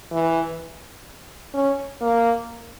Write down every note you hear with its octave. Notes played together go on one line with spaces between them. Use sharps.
E3
C#4
A#3